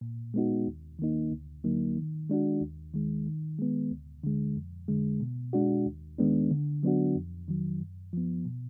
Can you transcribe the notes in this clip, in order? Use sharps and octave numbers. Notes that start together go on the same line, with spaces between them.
A#2
G#3 B3 D#4 F#4
D#2
D#3 A#3 D#4
D2
D3 F#3 A#3 D#4
D#3
G#3 D4 F#4
D#2
D#3 G#3
D#3
G#3 B3
D2
D3 G#3
F2
D3 G#3
B2
G#3 D4 F#4
D#2
D#3 G#3 B3 D4
D3
F#3 B3 D4 F#4
F2
D#3 F#3
F#2
F3 B3
B2